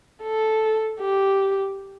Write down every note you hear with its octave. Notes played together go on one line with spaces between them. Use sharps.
A4
G4